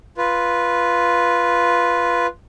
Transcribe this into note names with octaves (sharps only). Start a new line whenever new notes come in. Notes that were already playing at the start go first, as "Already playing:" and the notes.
F4 B4